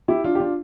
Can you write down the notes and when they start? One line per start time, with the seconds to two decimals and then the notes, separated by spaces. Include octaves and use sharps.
0.08 E4 G4
0.24 D4 F4
0.35 G4
0.40 D4 F4